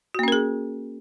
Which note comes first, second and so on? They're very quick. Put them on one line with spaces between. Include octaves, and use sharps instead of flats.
F#4 A#3 C#4 A#4 G#4